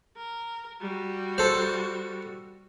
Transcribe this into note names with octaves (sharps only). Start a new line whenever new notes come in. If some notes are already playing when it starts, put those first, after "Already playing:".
A#4
G3 F#4
A4 C5